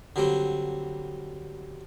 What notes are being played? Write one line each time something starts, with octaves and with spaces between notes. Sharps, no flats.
D3 F#3 G3 C4